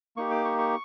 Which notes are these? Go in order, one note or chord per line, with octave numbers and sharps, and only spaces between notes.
A#3 D#4 G4 C#6
D6
C#6
C#6